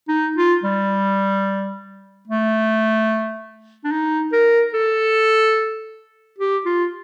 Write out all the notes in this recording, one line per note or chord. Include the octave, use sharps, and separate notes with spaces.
D#4
F4
G3
A3
D4
D#4
A#4
A4
G4
F4